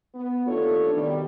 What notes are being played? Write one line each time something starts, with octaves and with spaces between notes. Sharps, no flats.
B3
D#2 A3 D4 F4 A4 C#5
B2 D#3 G3